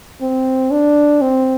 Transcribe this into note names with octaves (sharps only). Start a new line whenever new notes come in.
C4
D4
C4